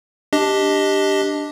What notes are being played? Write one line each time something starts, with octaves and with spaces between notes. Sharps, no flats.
D4 G4 D#5